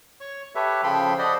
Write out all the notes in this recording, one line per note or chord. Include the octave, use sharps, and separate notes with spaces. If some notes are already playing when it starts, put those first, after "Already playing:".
C#5 C#6
G4 A4 B4 C#5 E5
C#3 F3 A4 G5 B5 C6
C5 D5 D#5 F#5 B5 C6